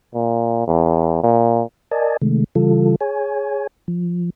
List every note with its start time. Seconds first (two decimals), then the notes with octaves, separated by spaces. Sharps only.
0.14 A#2
0.67 E2
1.23 A#2
1.91 A#4 D5 D#5 G#5 A5
2.22 C3 D#3 G#3 A3
2.55 C#3 E3 G3 F4 A4
3.01 G#4 C#5 G#5
3.88 F3